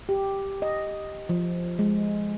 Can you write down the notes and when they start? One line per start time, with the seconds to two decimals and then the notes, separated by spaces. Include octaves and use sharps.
0.09 G4
0.62 D#5
1.29 F3
1.79 G#3